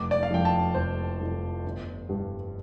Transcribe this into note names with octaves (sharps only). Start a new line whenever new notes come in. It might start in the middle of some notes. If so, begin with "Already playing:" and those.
Already playing: F1 D6
D5
F5
F2 F3 G5
A5
F1 C5
F2 F3
G1
G2 G3